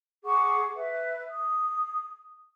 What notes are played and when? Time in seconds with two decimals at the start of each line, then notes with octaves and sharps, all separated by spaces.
0.24 G#4 F#5 C#6 D6
0.74 B4 E5
1.28 D#6